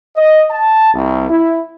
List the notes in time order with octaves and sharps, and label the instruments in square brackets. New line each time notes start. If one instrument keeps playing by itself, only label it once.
[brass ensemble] D#5
A5
C2
E4